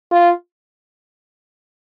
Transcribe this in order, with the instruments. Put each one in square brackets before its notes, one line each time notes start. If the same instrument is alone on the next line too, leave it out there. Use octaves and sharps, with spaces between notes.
[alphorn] F4